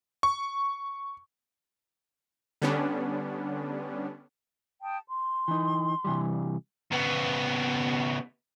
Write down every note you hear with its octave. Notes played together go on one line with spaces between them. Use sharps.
C#6
D3 G3 B3 C#4 D4
G5 A5 D#6
C6
E3 D#4
C3 E3 G3
C#3 B3